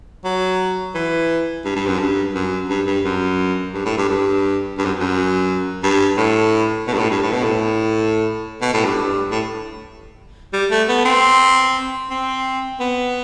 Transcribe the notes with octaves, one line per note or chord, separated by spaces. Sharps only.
F#3
E3
G2
G2
F#2
G2
F#2
G2
G2
F#2
G2
A2
G2
G2
G2
F#2
F#2
G2
A2
B2
G2
A2
G2
A2
B2
A2
B2
A2
G2
G2
A2
G3
A3
B3
C4
C4
B3